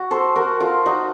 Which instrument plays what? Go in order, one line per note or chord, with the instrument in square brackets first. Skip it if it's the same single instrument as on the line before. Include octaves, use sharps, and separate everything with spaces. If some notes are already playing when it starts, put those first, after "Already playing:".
Already playing: [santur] F#4
A4 C5
F#4 A#4
F4 A4
D#4 F#4